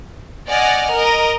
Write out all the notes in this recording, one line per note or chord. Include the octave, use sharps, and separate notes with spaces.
D5 D#5 F#5 G#5 F6
A#4 D#5